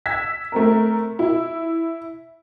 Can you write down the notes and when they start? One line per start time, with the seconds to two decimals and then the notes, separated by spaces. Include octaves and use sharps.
0.06 E6 G#6 B6
0.52 A3 C4 A#4
1.19 E4